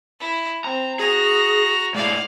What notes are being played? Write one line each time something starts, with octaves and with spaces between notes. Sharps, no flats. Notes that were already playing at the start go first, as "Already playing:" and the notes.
E4
C4 A#5
F#4 G#4 A#5
G#2 E4 D5 F5